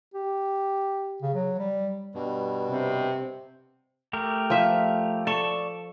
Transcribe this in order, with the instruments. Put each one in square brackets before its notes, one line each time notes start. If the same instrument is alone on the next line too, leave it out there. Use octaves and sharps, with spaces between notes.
[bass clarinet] G4
C#3
F#3
G3
[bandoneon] G2 B2
[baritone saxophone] C3
[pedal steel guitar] A3 G4 A#4
[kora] F3 E5
[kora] A4 [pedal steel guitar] D5 A5 C#6